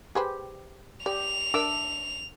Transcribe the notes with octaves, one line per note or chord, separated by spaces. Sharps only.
G4 G#4 B4 C5
G4 D5 F7
D4 A#4 E5 D6 E6